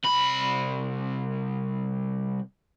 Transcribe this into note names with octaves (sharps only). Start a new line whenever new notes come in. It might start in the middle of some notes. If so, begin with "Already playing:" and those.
C2 B5